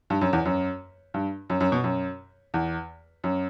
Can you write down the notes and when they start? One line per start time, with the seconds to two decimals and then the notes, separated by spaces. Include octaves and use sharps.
0.10 G2
0.21 F#2
0.33 E2
0.45 F#2
1.14 G2
1.50 F#2
1.60 F#2
1.72 B2
1.84 F#2
2.54 E2
3.24 F#2